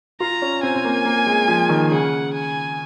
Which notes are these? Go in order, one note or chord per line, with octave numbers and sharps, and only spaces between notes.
F4 A#5
C#4
C4 G#5
C4
A#3
A#3
G#3
F3
D#3
C#3 F#5
G#5